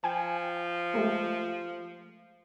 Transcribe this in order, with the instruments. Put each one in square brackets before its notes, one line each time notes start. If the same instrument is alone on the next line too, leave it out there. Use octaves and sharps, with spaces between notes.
[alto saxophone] F3 [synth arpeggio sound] G5 G#5
[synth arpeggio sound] G#3 A3 G4